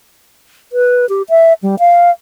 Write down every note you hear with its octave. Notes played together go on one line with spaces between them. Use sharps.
B4
G4
E5
G3
F5